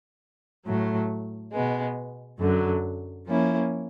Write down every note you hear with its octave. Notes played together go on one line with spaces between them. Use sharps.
A2 F#3 A3
B2 G#3 B3
F#2 D3 F#3
F3 A#3 C#4 E4